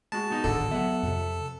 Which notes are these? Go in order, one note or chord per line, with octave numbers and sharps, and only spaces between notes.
G#3 F#4 A5
B2 D#4 D#6
D1 G#1 D3 A4
F#3 G3 B3 E5 F#5
F2 C3